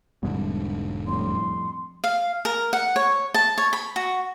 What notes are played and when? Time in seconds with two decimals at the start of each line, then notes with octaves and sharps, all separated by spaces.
0.23 E1 C2 G#2 D3
1.07 F2 A2 G3 C6
2.04 F5
2.45 A#4
2.73 F#5
2.96 C#5
3.34 A5
3.58 C#5
3.73 B5
3.96 F#4